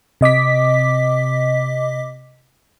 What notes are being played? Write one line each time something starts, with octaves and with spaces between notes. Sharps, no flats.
C3 D#5 D6 B6